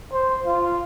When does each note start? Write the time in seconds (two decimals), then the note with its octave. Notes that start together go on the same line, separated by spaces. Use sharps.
0.13 C5
0.45 F4